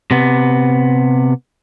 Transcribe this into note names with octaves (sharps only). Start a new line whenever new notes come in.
C3 B3